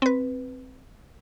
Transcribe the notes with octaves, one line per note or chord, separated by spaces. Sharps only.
C4 B4